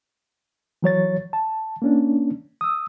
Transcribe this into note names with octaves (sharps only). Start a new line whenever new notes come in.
E3 F#3 C#5 A6
A5
A#3 C#4 D4
D#6 E6